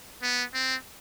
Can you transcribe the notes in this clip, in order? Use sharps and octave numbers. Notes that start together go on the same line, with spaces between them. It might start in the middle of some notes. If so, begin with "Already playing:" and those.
B3
C4